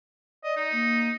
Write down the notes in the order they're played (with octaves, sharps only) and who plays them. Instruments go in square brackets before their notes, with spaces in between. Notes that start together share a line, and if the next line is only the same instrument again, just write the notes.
[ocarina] D5 [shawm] D#5
[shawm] D#4
[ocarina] A#3